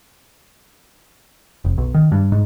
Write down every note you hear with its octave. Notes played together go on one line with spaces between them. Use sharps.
F1
B1
D#3
G2
G#2